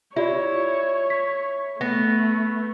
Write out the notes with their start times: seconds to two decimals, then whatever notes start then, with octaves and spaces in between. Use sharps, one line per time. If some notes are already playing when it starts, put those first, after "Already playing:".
0.16 E4 F4 G4 C#5 D5
1.10 B6
1.81 A3 B3 A#6